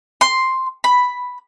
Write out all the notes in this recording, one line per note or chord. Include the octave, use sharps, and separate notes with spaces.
C6
B5